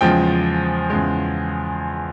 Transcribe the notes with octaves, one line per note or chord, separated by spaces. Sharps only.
E2 C#3 F3 G#3 G5
E2 C#3 F3 G#3